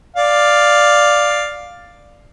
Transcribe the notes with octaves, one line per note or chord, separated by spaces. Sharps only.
D5 F5